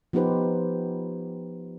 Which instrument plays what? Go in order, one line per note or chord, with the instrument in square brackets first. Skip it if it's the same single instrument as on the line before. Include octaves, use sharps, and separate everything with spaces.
[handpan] F3 B3 D#4 G4 B4 C5